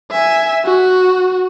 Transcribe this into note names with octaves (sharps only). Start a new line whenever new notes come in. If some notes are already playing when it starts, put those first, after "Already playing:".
E5 G#5
F#4